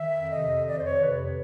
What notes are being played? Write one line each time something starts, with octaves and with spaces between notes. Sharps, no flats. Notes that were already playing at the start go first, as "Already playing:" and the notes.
Already playing: D#3 E5
F2
C3 D#5
F2
D#3 D5
C5
F2 C#5
C3 B4
F2